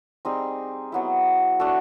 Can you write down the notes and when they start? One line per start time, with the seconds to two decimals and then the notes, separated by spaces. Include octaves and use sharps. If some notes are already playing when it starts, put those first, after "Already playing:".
0.25 G3 C4 D#4 G#4
0.92 F#3 B3 E4
1.60 A3 D4 F#4 A4